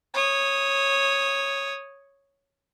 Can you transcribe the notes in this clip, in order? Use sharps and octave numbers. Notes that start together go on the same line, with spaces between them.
C#5 D#6